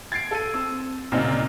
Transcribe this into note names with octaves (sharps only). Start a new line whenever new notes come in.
G#6 A6 C7 D7
A4 D#7
C4 E6
D2 A#2 C#3 C4 D#4